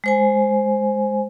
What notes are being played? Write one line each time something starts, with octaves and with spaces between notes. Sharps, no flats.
G#3 C5 G#5